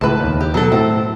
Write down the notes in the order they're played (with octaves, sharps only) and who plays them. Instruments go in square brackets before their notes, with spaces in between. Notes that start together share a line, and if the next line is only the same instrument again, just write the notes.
[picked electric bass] C#2 A2 [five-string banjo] B4 A5
[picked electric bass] D#2
[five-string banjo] G4
[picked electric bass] B2 [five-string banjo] F#3 A4
[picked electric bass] A2 [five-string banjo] C4